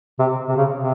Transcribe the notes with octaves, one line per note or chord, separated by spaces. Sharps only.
C3
C3
C#3
C3